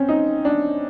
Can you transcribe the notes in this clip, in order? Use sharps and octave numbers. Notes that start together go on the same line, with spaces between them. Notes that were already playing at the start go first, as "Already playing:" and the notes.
Already playing: C4 C#4
D#4
D4